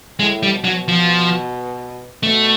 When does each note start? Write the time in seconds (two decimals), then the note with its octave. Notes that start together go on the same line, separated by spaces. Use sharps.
0.19 A2 G#3
0.43 G3
0.53 B2
0.64 F#3
0.88 F3
2.23 B2 A3